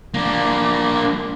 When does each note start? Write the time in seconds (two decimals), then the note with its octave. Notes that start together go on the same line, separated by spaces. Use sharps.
0.14 A#3 D4